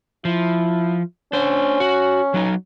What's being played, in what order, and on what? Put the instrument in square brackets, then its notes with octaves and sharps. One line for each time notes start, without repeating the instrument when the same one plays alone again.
[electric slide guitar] F3 [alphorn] E4
[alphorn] C#4 [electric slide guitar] D4 C5
[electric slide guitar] F#4
F#3 D#4